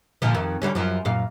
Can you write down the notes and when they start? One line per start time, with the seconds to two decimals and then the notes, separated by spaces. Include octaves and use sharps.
0.22 A#2 D3 F3
0.34 F2 D#3
0.62 D3 G3 C#4
0.75 F#2 F3
1.05 F#2 A#2 F5